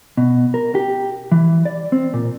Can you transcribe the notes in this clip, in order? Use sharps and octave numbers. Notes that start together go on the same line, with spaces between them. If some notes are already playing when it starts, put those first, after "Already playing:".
B2
A#4
G4
E3
D5
C4
A#2